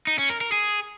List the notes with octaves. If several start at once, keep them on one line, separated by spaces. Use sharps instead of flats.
D#4
C#4
A#4
A#4
G#4